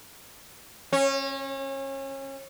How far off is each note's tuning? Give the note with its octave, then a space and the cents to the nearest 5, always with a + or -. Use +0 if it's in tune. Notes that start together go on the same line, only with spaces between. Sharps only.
C#4 -30